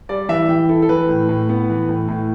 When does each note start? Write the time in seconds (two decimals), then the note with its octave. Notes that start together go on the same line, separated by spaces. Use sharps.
0.09 G3 D5
0.29 E3 E5
0.49 E3 G5
0.69 E4 A4
0.82 A4
0.89 E3 B4
1.09 A2
1.29 A2
1.49 B3
1.69 E3
1.89 A2
2.08 A2